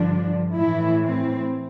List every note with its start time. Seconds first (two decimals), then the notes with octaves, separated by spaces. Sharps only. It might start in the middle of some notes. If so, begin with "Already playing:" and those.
Already playing: G2 D3 F3 D4
0.55 A2 E3 E4
1.05 C4